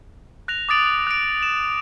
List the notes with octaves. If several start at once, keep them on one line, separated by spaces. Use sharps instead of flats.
F#6 A#6 F7
D6 D#6 A6 D7 F#7
F#6 D7
E7